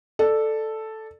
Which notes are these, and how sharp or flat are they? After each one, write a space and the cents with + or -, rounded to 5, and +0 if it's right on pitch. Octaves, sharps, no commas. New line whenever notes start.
A4 +0 D5 +20